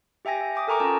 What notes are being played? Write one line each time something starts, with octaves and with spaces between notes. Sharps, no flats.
G4 E5 G5 G#5 A#6
E5
G5 D6 D#6
A4 A#4 G#5 A#5 C#6 D6
C#4 F4 G#5 A5